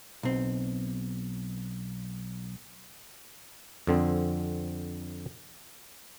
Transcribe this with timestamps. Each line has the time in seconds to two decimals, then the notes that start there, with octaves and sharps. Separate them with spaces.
0.23 B1 C4
3.87 F2 D3 C4